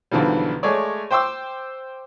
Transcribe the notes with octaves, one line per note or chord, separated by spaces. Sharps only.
B1 G#2 D3 E3 F3 G3
G#3 A3 G#4 C#5 D5
C5 G5 C6 D6 E6